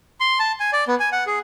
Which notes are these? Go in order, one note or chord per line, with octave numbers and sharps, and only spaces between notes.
C6
A5
G#5
D5
B3
G#5
F#5
G#4